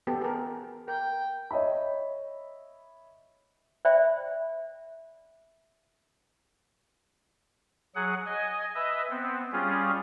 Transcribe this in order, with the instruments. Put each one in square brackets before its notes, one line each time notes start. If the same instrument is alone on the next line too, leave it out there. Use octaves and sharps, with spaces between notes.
[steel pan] B3 G4 A4
G#4 A#4
[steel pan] A#4 [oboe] G5
[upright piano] C#5 D#5 E5 B5
[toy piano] C5 D5 E5 G5 B5
[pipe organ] F#3 G#4 F#5
D#5 G#5
B4 D#5 E5
B3 C4
G3 C#4 F4 G#4